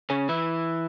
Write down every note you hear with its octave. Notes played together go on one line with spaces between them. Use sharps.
C#3 C#4
E3 E4